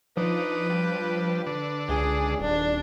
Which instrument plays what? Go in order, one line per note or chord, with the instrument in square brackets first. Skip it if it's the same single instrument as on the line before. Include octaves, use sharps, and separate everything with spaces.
[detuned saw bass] F3 [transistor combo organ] D4 D#4 [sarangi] B4
[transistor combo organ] G3 D4
D3 D4
[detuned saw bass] C#2 [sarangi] G#4
[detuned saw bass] D#1 [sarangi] D4